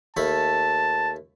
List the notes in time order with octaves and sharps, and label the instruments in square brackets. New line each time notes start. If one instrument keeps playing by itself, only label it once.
[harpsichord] D#2 A3 B5 [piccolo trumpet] A5